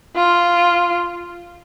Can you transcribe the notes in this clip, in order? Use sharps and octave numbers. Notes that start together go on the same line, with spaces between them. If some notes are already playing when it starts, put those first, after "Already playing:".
F4